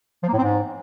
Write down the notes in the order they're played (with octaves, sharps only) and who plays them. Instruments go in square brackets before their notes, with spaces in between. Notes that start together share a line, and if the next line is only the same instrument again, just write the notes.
[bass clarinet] F3
A#3
A2
C4
G#2